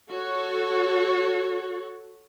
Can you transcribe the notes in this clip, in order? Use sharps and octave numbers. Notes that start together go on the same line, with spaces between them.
F#4 A4 C#5